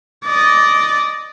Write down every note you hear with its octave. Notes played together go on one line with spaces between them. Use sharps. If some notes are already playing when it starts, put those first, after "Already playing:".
D5 D#5